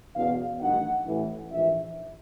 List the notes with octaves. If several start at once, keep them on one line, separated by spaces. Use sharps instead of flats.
F#1 E2 B2 F5
A1 G2 D#3 F#5
A1 A2 E3
A#1 G#2 E3 E5